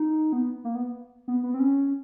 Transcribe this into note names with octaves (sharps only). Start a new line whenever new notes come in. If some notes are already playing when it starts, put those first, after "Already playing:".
Already playing: D#4
B3
A#3
B3
B3
B3
C4
C#4